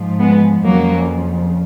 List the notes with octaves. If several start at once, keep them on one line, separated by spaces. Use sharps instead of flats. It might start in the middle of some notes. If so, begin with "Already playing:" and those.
Already playing: G#2 F3
G#3 B3
F2 C#3 F3 F#3 A#3